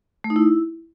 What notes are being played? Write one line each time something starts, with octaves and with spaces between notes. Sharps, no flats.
A3
D#4
E4